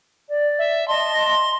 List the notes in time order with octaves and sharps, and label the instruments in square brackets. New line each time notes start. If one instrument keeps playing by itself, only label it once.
[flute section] D5
[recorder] E5
[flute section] D#5 A5 [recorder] C6